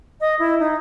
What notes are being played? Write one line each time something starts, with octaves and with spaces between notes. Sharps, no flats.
D#5
E4
D#4